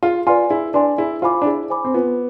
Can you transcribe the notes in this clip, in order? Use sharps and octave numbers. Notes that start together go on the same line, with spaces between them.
F4 G#4
F4 B4 D5 G#5 C6
E4 G#4
D4 B4 D5 G#5 C6
E4 G#4
F4 C5 G#5 B5 D6
D4
E4 G#4
C5 G#5 B5 D6
C4
B3 F4